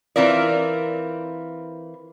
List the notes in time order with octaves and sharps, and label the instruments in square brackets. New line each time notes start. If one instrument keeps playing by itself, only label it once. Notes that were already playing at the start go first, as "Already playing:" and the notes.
[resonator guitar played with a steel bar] E3 C4 F4 A#4 D5